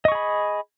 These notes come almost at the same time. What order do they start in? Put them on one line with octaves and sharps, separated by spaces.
D#5 C#6 G#4 B5